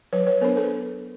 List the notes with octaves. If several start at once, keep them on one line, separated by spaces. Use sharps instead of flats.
F#3 B4 C#5
B4 C#5
B3 D4 A#4 C5
A4 B4